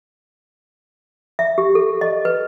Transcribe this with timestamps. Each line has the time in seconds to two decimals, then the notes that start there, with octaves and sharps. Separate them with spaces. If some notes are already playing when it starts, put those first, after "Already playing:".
1.39 E5
1.58 G4
1.75 A4
2.01 D#5
2.25 B4